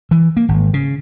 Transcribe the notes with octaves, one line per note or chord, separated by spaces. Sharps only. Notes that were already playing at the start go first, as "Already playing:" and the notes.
E3
A#3
G#1
C#3